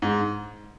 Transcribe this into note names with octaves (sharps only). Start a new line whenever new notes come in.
G#2